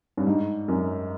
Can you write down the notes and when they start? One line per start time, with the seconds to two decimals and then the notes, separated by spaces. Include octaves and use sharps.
0.17 G2
0.27 G#2
0.68 F#2